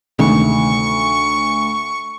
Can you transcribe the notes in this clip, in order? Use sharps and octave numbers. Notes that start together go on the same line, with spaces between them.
D2 C3 D#3 G#3 C#6